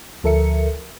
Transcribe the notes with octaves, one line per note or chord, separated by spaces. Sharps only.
D2 F3 A4 A#4 E5 C#7